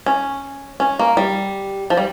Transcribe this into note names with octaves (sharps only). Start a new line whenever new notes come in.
C#4
C#4
A#3
G3
F3
G3